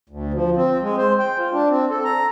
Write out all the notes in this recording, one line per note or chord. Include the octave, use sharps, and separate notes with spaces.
D2
F3
C4
G#3
C5
G5
F4
D4
C4
A4
A#5